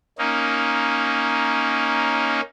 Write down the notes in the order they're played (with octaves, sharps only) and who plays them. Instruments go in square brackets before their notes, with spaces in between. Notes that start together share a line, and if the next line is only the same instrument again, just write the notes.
[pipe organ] A#3 C#4 D#4